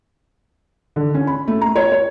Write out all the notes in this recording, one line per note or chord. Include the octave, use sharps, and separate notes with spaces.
D3
C#4
B5
A3
A#5
C#5
C#5